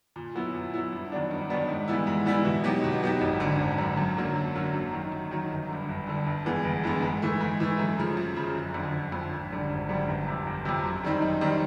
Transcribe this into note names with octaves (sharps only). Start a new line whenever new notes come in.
A#2
F#3 B3 E4
A#2
F#3 B3 E4
G2
D#3 F#3 B3 D4
G2
D#3 F#3 B3 D4
G#2
E3 G3 B3 E4
G#2
E3 G3 B3 E4
B2
F#3 B3 D#4 G4
B2
F#3 B3 D#4 G4
G#1
F#2 D3
G#1
F#2 D3
F#2
D3 F#3 A#3
F#2
D3 F#3 A#3
F#2
D#3 F#3
F#2
D#3 F#3
G1
G2 D3
G1
G2 D3
G1
G2 E3 G#3 B3
G1
G2 E3 G#3 B3
G#2
E3 A3
G#2
E3 A3
F#2
C#3 F3
F#2
C#3 F3
F#1
F2 D3
F#1
F2 D3
G#1
F#2 D3 G3
G#1
F#2 D3 G3
G1
F2 C3
G1
F2 C3
F#2
D#3 G3 C4 D#4
F#2
D#3 G3 C4 D#4